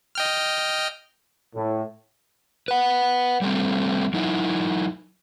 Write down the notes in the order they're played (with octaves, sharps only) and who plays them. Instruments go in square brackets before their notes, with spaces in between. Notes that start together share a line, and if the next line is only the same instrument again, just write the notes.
[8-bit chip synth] D#5 G5 F6
[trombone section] A2
[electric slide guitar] B4 F#5
G3 A3 C4
F#3 D#4 E4